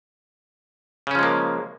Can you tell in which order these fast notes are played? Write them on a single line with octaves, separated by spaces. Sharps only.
C#3 C#4 F3 G#3 A#3